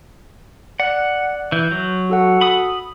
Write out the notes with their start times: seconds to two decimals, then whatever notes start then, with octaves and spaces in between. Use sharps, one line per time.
0.80 D5 F#5 F#6
1.52 E3 G6
1.72 F#3
2.10 F#4 A4 F#5
2.41 B5 D#6